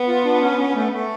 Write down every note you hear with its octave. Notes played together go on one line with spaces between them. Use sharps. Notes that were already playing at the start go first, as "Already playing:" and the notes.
Already playing: B3
F4
D4
C#4
C#4
A3
A3